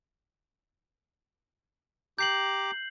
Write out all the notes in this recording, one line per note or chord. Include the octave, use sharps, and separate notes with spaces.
G4 A#5 D6 G6 C7 F#7